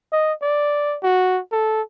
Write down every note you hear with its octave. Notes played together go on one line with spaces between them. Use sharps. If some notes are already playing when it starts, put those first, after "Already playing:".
D#5
D5
F#4
A4